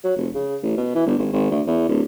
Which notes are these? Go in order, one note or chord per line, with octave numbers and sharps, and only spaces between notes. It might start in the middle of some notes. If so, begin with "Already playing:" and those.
F#3
F1
C#3
A1
B2
E3
G1
G#1
G#1
D2
E2
D1